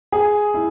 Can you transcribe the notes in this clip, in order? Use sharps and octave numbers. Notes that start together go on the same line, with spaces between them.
G#4
E4